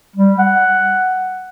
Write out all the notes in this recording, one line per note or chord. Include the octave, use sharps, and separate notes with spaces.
G3
F#5